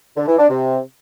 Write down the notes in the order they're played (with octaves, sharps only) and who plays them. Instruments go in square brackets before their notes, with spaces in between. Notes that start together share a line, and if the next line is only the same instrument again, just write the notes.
[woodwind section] D3
E3
D4
C3